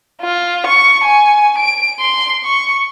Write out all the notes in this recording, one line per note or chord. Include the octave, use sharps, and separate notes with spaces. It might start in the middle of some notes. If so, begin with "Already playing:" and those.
F4
C#6
G#5
D7
C6
C#6